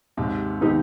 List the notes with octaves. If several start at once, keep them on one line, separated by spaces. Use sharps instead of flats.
D#2 G#2 C3
D#3 B3 D#4 G4